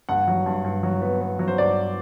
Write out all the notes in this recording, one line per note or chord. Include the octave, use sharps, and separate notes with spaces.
G2 F#5
F#3
G2
G2
F#3
B3
B3
F#3
C5
G2 D5